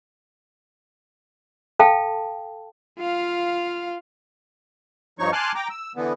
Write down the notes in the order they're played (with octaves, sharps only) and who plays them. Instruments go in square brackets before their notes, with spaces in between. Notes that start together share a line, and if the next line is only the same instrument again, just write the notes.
[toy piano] A4 F5 G5 A5
[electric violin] F4 F5
[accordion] G2 F3 D#4 C#5 C#6
G#5 A5 C6 D6 F6 F#6
G5 A#5 D6
E6
D3 E3 B3